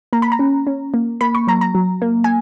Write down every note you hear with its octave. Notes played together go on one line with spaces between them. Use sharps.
A#3 A#5
B5
A#5
C#4
C#4
A#3
A#3 B5
C#6
F#3 A#5
A#5
F#3
A#3
G#5